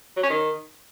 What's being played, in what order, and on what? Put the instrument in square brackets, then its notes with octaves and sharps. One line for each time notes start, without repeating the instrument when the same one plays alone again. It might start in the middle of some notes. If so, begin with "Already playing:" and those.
[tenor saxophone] F#3
C#4
D#3